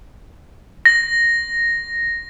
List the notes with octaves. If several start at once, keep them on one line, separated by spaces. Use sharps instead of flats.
A#6